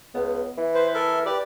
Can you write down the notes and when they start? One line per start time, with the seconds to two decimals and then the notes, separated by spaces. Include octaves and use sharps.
0.14 C#2 B3
0.58 E3
0.74 B4 C5
0.94 A4 A#4 E5
1.26 G4 B4 D5